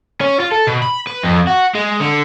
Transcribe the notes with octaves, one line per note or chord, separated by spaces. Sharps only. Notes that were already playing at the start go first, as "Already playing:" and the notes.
C#4
F4
A4
B2
B5
B4
F2
F#4
G#3
D3